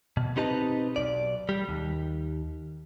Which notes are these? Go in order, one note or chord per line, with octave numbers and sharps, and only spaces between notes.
B2
C4 D#4 G4 B4 D#5 A5
B1 G2 D5
G3
D#2